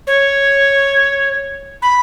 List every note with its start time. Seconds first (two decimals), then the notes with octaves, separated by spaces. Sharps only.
0.07 C#5
1.82 B5